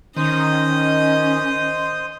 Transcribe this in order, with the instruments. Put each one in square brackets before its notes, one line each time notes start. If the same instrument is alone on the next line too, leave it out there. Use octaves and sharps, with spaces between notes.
[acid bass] D#3 [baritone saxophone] C#4 [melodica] C5 D#6 [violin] D#5